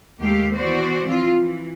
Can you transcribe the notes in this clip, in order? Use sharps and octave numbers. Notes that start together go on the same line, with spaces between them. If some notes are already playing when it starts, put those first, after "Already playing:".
D#2 G#3 A3 G4 F5
E3 B3 F#4 C5 D5
E3 F3 C4 F4
E3